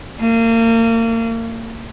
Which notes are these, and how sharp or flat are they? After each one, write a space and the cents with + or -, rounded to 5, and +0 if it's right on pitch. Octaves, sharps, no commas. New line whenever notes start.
A#3 -35